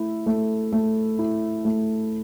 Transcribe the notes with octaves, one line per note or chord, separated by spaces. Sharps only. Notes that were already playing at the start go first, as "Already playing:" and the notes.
Already playing: A3 E4
A3
A3
E4
A3